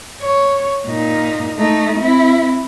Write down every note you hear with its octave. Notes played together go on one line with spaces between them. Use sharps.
C#5
A#2 D#4
A3 D#4
C4 E4